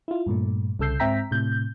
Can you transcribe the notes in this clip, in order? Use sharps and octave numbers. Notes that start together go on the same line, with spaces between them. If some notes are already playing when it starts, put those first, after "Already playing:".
E4 F4
G2 A#2 A3
C2 C#3 A4 E6 G6 C7
G#2 C4 E5 G5 A#5 B6
A2 C3 G6